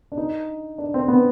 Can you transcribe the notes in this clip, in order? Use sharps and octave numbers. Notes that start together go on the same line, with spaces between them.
D4
D#4
D4
C4
B3